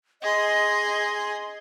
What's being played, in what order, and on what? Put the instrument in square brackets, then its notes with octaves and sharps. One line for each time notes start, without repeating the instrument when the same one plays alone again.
[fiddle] G#4 C6 [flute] D#5